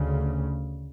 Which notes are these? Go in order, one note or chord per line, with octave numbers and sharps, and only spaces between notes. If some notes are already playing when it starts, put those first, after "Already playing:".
Already playing: D2 C#3